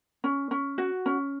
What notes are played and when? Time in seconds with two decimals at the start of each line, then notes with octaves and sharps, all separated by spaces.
0.24 C#4
0.51 C#4
0.78 F#4
1.06 C#4